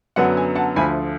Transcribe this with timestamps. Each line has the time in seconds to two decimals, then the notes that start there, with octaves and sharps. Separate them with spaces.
0.16 F#2 D3 F#3 B3 D4 F#5
0.37 G#5
0.56 F#5 A5
0.76 D2 D3 F3 A3 G#5 B5